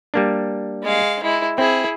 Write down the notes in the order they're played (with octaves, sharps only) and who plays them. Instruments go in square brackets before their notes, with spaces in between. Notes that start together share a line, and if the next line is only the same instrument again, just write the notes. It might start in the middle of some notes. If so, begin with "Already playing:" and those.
[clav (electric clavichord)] G3 A#3 D4
[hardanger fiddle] G#3 F5
G#3 E4
[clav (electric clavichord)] C4 [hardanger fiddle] E4 G#4